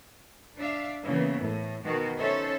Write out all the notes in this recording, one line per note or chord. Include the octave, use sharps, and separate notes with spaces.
D4 E5 F5
C#3 E3 A#3 B3
A2
B2 D#3 F#4
C#4 D#4 A4 C5 C#5 E5